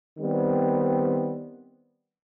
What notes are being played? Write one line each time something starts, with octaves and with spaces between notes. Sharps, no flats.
D#3 G3 B3 C4